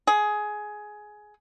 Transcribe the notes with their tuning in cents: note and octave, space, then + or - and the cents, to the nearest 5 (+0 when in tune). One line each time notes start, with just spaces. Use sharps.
G#4 +15